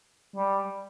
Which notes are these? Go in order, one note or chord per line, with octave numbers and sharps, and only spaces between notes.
G3